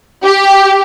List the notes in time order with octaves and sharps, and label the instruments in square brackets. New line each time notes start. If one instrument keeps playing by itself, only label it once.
[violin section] G4